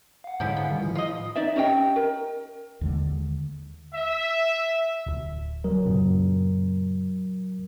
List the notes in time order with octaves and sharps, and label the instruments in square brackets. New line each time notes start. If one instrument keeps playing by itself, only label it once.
[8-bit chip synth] F5 F#5
[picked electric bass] G#2 D3 G#3 [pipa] F3 C#4 E4
[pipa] B3
[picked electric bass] D#3 G3
[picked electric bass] A2 F3 [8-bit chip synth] E4
[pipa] F4 D#5
[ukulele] D#4 D5 E5
C#4 G4 D#5 G5
A#4
[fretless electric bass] D#2 D3 G#3
[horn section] E5
[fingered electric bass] D1
[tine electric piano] F#3 A#4
[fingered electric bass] F#2 A#2 C#3